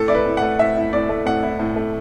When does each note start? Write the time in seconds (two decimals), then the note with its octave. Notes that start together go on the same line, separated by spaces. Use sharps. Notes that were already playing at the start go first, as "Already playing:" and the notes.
Already playing: A2 A4
0.08 E4 D5
0.15 B4
0.26 A2
0.37 A3 F#5
0.59 A2 E5
0.76 E4
0.93 A2 D5
1.09 A3
1.26 A2 F#5
1.43 E4
1.60 A2
1.76 A3